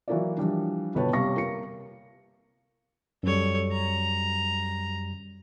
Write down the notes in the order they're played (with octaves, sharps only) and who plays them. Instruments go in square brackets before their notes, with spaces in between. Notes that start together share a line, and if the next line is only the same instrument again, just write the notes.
[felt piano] E3 F#3 A#3 E4 F#4 D5
E3 F3 G3 D4
G1 B2 B4 C#5 G5 A5
C3 G3 F5 C#6 A#6
A#3 C#7
[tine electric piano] F#2 G3 [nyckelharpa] A4 C#5
[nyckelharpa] A#5